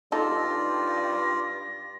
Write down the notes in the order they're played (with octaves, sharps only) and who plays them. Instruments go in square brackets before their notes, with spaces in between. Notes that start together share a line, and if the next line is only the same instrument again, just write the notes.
[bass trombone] G2 [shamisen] D#4 A4 [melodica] F4 D5 [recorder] A#6